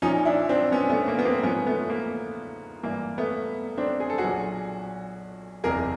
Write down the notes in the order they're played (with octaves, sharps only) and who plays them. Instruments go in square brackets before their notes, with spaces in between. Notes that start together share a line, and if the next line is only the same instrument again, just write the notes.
[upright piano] A#1 A#2 F3 C#4 D#4
D4 E4
C4 D4
B3 C#4
A3 B3
A#3
B3
A#3 C4
A1 G#2 F3 B3 C#4
A3 B3
A#3
G#1 G2 E3 A#3
A3 B3
C4 D4
G#4
A4
F#4 G#4
B1 A#2 F#3
F#1 E2 C3 G#4 A#4